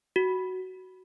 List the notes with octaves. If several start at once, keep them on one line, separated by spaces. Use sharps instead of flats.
F#4